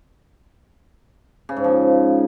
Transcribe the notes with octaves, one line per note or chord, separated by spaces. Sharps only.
C#3
G#2
F3